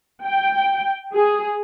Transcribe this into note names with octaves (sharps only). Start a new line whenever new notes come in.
G5
G#4